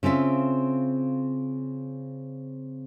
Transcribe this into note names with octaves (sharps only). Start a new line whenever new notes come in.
C#3 C4 F4 E5